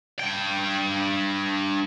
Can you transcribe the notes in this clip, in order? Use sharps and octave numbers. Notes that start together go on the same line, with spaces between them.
G2 G5